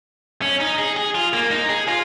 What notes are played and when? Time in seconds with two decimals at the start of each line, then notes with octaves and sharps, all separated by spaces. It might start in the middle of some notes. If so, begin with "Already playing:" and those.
0.42 C#4
0.60 D#4
0.79 G#4
0.96 G#4
1.15 F4
1.33 A#3
1.51 D#4
1.69 G#4
1.88 F4